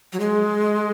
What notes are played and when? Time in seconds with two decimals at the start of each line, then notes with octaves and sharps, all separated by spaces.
0.13 F#3
0.20 G#3